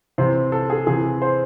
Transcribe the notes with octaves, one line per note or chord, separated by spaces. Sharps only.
C3 E3 C5
A4
G#4
C3 E3 G#4
C5